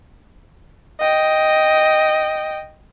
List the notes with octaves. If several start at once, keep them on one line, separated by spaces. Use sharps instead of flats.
D#5 G5